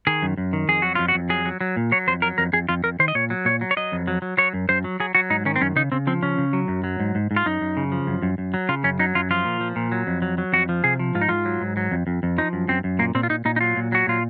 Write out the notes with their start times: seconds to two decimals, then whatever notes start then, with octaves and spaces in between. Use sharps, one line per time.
0.07 D#3 G#4
0.22 F#2
0.37 F#2
0.53 D#3
0.69 F2 G#4
0.82 F#3 F#4
0.95 F2 F4
1.08 F#4
1.14 F2
1.29 F#3 G#4
1.45 F#3
1.61 F#3
1.77 A#2
1.92 F#3 C#5
2.07 F2 C5
2.22 F#3 A#4
2.38 F2 A#4
2.53 F2 G#4
2.69 F2 F4
2.84 F2 A#4
2.99 D#3 C5
3.08 D#5
3.15 A#2 C#5
3.30 F#3
3.45 A#2 C#5
3.61 F#3
3.71 C#5
3.77 F#3 D#5
3.92 F2
4.07 F#3
4.22 F#3
4.37 F#3 C#5
4.54 F#2
4.69 F#2 C5
4.84 F#3
5.00 F#3 G#4
5.15 F#3 F#4
5.30 G#2 D#4
5.45 D#3 C#4
5.56 C4
5.61 F#2 C#4
5.76 C#3 D#4
5.92 C#3 C4
6.07 F3 C4
6.23 C#3 C#4
6.38 C#3
6.53 F#3
6.68 F#2
6.84 F#3
7.00 G#2
7.15 G#2
7.31 G#2
7.36 F4
7.46 F#2 D#4
7.61 F#2
7.77 C#3
7.92 F3
8.07 F#2
8.22 F#2
8.38 F#2
8.54 F#3
8.69 C#3 F4
8.84 F#2 C#4
8.99 F#3 D#4
9.15 F#2 F4
9.31 F3 F4
9.45 A#2
9.61 F3
9.76 A#2
9.92 F#3
10.07 F2
10.22 F#3
10.38 F#3
10.53 F2 F#4
10.69 F3
10.84 C3 G#4
10.99 F3
11.15 G#2 F4
11.21 D#4
11.29 G#2 F4
11.45 F#3
11.61 G#2
11.77 F#3
11.92 F2
12.07 F2
12.23 F2
12.38 F3 D#4
12.53 F#2
12.68 F#2 C4
12.84 F#2
12.99 A#2 A#3
13.15 A#2 C4
13.23 F4
13.30 A#2 D#4
13.45 A#2 D#4
13.56 D#4
13.61 F#3 F4
13.77 A#2
13.92 F#3 F#4
14.07 A#2 F4